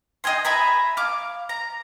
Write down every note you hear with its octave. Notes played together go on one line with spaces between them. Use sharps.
D#5 G5 G#5 C6
E5 G#5 A#5 B5
F5 D6
A#5